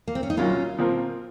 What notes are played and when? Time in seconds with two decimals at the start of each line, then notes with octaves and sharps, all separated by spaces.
0.07 A#3
0.15 C4
0.23 C#4
0.30 D#4
0.37 C2 A#2 F#3 A#3 C#4 F4
0.79 A#2 F3 C4 F4 A#4